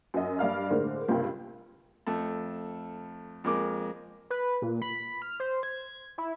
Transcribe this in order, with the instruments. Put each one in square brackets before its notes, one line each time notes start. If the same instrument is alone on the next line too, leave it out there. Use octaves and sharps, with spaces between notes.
[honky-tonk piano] F#2 F#4 D#5
G2 D5 F5 F6
A2 D3 G#3 A#3 C5
C#2 G2 C3 F4 A#4 G5
[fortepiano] F2 A3 A5
F2 G#3 A#3 D6
[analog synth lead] B4
A#2
B5
F6
C5
G#6
E4